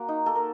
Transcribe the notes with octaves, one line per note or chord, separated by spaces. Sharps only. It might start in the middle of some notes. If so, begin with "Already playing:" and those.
Already playing: A#3 F#4
D#4
A#3 A4
A#4